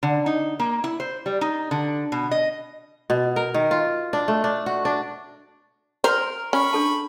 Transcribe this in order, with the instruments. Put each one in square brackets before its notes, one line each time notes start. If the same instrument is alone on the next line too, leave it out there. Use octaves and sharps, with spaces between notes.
[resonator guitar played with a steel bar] D3
D#4
A#3
E4
C5
G3
D#4
D3
B2
D#5
[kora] B2
A#4
D#3
F4
D4
A3
D4
F#4
D4
[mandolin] A#4 [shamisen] C5
[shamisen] C#4 [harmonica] B5 C#6
[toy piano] D4 A4 A5